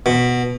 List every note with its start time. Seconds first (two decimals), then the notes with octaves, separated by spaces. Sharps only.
0.06 B2